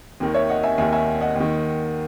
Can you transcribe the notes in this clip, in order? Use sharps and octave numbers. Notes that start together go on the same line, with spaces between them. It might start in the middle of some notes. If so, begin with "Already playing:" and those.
D#2 D#3
C#5 E5
D#5 F#5
E5 G#5
D#2 D#3 E5 G#5
E5 G#5
D#5 F#5
D#2 D#3